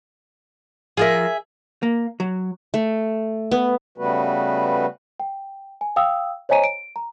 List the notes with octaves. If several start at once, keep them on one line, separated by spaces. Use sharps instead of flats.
F3 F4 G#4 A#4 E5
A#3
F#3
A3
B3
C#3 G3 A3 B3 F#4 B4
G5
G#5
F5 G5 D#6 E6
C5 C#5 D#5 G#5 A#5 D#7
D7
A#5